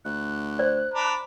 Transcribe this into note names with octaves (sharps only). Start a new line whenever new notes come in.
D2 F#6
C5 D5
D4 A#5 B5